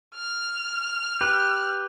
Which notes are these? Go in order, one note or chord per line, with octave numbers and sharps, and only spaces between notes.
F6
G4 B4